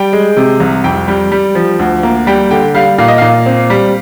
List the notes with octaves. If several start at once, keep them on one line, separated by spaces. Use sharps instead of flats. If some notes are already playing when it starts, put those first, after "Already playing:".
Already playing: G3 G5
G#3
C3
C2
F2 G5
G3
G3
F3
D2
A#3
G3 G5
D3 G5
G3 F5
A#2 F5
D#5
A#2 F5
C4
G3